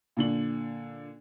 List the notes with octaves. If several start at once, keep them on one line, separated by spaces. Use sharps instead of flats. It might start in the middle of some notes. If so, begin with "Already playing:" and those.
A#2 D3 F#7